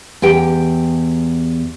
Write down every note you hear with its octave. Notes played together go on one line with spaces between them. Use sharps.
E2 G4 G5